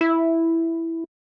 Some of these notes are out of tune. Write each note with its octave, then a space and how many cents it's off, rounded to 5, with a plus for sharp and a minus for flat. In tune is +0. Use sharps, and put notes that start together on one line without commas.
E4 +0